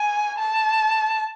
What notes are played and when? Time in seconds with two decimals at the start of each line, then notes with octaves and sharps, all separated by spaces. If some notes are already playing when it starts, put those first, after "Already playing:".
Already playing: G#5
0.38 A5